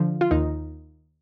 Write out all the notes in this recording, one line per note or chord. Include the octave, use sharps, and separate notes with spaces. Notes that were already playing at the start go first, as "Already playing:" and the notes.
Already playing: D3 F3
F4
D#2 D#4